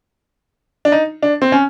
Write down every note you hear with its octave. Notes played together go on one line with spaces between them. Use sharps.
D4
D#4
D4
C4
C#4